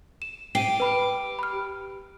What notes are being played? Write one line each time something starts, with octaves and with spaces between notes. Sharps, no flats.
E7
G4 C7 D#7
B4 B5 F6
B5 F6